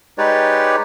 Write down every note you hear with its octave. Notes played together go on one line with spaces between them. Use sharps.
G#3 D#4 G4 B4 C#5 D5